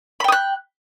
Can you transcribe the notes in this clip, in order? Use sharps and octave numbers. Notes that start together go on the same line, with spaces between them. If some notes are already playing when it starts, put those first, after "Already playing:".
G5 B5 D#6 F#6